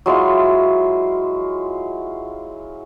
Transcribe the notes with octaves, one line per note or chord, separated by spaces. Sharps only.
F#3 G#3 E4 F4